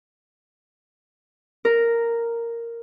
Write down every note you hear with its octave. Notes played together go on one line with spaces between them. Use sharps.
A#4